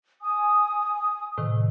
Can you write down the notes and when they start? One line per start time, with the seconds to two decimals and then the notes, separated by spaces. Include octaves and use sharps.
0.21 G#5 D#6
1.38 A2 C3 D#3